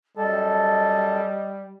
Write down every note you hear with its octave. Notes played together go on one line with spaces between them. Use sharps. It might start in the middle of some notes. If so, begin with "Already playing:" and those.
F#2 G3 A4 D#5 A5